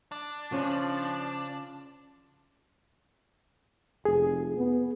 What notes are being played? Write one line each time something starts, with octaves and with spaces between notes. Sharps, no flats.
D4
C#3 F3 C#4
F1 G#4
B3